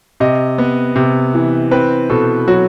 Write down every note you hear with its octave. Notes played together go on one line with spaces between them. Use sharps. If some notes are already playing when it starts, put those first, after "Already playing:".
C3 D#5
B3
C3
E3
C4 B4
B2 A4
F#3 F#4